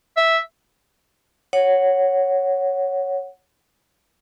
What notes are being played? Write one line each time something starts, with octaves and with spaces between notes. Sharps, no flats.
E5
C#5 F#5